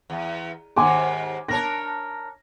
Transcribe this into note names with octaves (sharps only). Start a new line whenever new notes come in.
E2
D#2 G#2 D#3 G#5 C6 D6
D4 A#4 C#5 A5 A#6